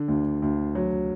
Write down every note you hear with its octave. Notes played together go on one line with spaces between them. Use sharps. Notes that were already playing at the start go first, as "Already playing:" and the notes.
Already playing: D3
D2
D2
F#3